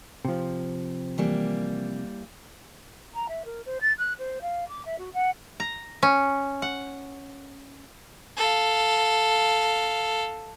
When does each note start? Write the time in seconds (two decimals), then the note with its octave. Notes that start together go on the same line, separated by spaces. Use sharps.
0.25 C3 F3
1.18 E3 G3 A#3
3.14 A#5
3.29 E5
3.45 A#4
3.66 C5
3.81 A6
3.98 F#6
4.19 C5
4.42 F5
4.69 D6
4.86 E5
4.99 F#4
5.14 F#5
5.60 A#5
6.03 C#4
6.62 F#5
8.37 A4 F5